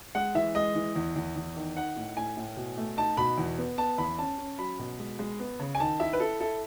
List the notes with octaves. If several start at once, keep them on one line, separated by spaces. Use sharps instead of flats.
G#3 F#5
E3 E5
G#3 D#5
E3
E2
E2
E2
D#3
D#4 F#5
A2
A2 G#5
A2
B2
A3
D#4 A5
B2 B5
E2
B3
B3 A5
E2 B5
C#4 A5
C#4
F#3 B5
B2
G#3
G#3
B3
C#3
G#5
D#3 A5
E4 E5
B4
E4 A4
E4 A4